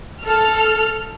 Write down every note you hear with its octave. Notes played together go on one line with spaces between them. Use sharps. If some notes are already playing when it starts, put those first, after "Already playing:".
A4 F6